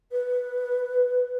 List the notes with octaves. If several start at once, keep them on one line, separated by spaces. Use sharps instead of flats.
B4